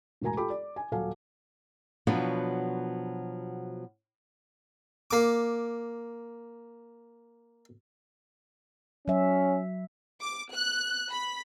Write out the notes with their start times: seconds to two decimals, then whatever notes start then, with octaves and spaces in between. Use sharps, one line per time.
0.21 E1 A2 F#4 A#4 G#5 A#5
0.37 F4 G4 A4 G5 B5 D6
0.50 D5
0.76 G#5
0.92 D#1 F#3 A4 F5 G#5
2.07 B2 F3 F#3 B3 D4 F#4
5.11 A#3 D6
9.08 F#3 C#4 E5
10.21 D6
10.53 F#6
11.10 B5